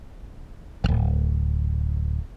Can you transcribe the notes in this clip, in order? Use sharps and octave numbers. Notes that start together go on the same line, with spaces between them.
D1 G1